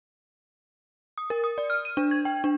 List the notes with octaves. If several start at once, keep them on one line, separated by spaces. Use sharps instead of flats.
D#6
A#4
D#6
D5
F6
D#7
D4
G#6
G5
D4